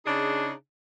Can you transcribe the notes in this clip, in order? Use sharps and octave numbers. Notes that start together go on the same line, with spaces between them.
C#3 D4 D#4 G#4